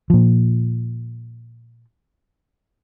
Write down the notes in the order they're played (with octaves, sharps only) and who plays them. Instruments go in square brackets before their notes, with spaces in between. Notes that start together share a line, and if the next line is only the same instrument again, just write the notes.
[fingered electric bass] A#2 F3